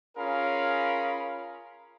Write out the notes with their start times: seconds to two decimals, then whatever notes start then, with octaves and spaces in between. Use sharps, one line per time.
0.17 C#4 F4 G#4 A#4 F5 B5